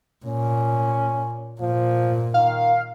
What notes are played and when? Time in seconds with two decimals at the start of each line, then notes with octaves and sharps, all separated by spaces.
0.25 A#2 C#4
1.61 A#2 F3
2.34 D#3 F5